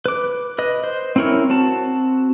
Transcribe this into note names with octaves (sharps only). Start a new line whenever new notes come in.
B4 D6
B4 D#5
C5
C4 C#4 E4 A#4 C#5
C4 F#4 A5